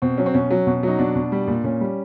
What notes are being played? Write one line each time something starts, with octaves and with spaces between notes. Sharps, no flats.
B2 C4
F#3 C#4
C4
B2 C#4
F#3
B2
F#3 D#4
B2 D4
B2
G3
A#2
A#2 C#4
G3